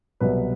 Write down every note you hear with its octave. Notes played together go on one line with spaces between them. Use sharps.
C2 B2 F#3 B4